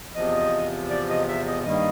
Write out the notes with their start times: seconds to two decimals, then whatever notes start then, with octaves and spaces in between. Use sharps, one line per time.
0.15 E2 C3 F3 D#5
0.90 D5
1.09 D#5
1.28 E5
1.46 D#5
1.64 G2 D#3 G3 A#3 D#5